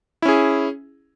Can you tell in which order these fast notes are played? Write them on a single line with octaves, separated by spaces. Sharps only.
E4 C#4 G#4